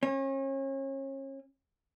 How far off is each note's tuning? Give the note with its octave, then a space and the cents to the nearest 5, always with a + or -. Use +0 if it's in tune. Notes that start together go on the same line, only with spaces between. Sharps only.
C#4 -35